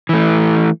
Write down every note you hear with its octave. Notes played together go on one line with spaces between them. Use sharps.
E3 A3